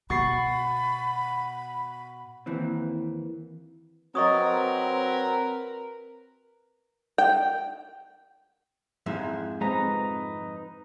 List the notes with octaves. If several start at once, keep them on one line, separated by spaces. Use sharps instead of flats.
B2 F#4 B5 C#6 A6 C7
D#2 E3 C4
F#3 C4 A#4 B4 D#5 C#6 D#6
G5
F2 G#2 E4
G#3 C4 D#4 B4 A#5